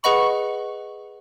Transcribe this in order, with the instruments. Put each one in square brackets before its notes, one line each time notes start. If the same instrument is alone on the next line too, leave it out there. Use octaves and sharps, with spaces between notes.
[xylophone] G#4 B4 D#5 F#5 B5 [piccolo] C#6